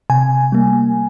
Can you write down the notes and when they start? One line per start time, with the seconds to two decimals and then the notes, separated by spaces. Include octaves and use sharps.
0.10 C3 G#5
0.52 G3 A#3